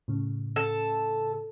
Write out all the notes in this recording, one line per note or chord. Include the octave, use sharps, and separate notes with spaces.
A2 C#3
A4